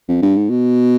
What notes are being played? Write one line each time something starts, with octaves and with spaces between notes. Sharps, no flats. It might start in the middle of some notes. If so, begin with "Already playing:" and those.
F2
G2
G#2
B2